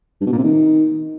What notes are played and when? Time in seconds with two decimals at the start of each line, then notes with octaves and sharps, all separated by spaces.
0.21 G2
0.27 B2
0.32 A#2
0.38 C3
0.44 D#3